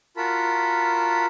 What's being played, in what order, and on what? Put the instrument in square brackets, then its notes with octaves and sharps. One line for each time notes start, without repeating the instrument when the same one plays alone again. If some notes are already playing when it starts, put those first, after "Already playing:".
[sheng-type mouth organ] F4 F#4 A#4 A5 B5